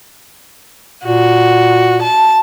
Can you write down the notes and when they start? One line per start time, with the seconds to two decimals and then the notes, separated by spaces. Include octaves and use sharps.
1.05 A#2 F#4
2.02 A5